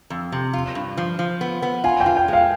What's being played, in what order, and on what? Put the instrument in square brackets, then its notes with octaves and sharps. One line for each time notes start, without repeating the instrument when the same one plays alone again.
[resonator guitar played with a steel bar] F2
C3
F4
G2
F3
F3
B3
B3
[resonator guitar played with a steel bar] F4 [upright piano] G#5
[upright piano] G5
[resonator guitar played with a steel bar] F4
[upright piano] G5
[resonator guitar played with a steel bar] G#3
[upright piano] F5